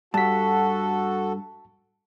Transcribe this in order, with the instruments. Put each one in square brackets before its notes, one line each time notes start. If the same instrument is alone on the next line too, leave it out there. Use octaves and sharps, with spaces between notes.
[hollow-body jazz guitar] G2 [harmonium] F#4 A4 [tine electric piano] A5 B6